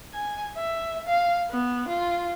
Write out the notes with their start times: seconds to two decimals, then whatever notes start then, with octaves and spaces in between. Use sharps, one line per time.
0.13 G#5
0.56 E5
1.07 F5
1.50 B3
1.89 F4